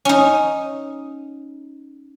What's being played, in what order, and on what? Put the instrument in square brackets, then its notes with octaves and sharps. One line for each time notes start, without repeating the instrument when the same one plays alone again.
[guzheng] C#4 D#4